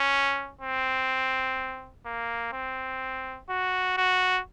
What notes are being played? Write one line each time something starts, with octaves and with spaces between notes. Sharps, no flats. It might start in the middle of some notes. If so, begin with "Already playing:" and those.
Already playing: C#4
C4
A#3
C4
F#4
F#4